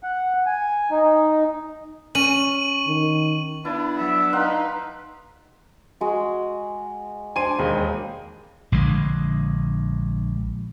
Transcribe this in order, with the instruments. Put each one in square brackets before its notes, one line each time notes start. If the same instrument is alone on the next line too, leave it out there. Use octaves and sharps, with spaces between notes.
[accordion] F#5
G#5
D#4
[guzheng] C#4 [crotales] C#6 D#7 F#7
[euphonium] D#3
[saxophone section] B3 D4 [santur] E4
[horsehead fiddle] F#3 E5
[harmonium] D#4 [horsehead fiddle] B4 [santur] F5 F#5 C6
[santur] G#3 F#4
[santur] D4 C5 D5 [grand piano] G#5 C6 D#7
[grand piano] E1 D#2 G#3 [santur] B5
[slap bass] A#1 D3 G#3